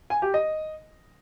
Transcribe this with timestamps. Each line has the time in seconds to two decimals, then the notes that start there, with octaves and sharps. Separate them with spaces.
0.10 G#5
0.22 G4
0.34 D#5